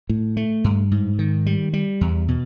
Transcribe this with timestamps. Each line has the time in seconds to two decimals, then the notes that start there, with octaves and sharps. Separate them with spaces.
0.09 A2
0.37 A3
0.64 G2
0.91 G#2
1.19 D#3
1.46 G3
1.73 G3
2.01 E2
2.28 B2